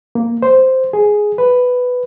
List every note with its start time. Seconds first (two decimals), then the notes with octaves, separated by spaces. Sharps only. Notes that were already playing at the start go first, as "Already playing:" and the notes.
0.15 A#3
0.42 C5
0.93 G#4
1.38 B4